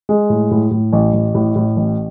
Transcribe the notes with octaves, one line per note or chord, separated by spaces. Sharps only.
G#3
A2
A2
A2
A1
A1
A2
A2
A1